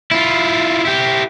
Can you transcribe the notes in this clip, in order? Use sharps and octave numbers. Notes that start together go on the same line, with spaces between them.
E4 F4
E4 G4